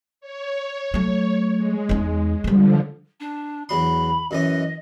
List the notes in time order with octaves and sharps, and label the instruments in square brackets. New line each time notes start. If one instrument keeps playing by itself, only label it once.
[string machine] C#5
[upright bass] F#3 A3
[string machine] G#3
[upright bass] E2 D#4
[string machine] D3 F3 [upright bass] G3 G#3
[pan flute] D4
[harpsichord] E2 F#3 C6 [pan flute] B5
[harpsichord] F#2 E3 C#4 [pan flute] D#5